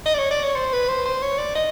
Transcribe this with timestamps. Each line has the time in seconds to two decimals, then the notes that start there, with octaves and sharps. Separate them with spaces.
0.06 D#5
0.14 D5
0.18 C#5
0.31 D5
0.44 C#5
0.56 C5
0.73 B4
0.88 C5
1.06 C5
1.23 C#5
1.38 D5
1.55 D#5